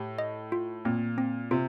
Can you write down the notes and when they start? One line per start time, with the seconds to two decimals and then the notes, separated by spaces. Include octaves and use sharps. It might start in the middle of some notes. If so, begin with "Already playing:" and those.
Already playing: A2 G4
0.19 D#5
0.52 F4
0.85 A#2 C4
1.18 C4
1.51 C3 F4